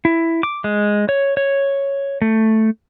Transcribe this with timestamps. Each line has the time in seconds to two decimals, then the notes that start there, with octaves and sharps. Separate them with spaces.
0.05 E4
0.43 D6
0.64 G#3
1.09 C#5
1.37 C#5
2.22 A3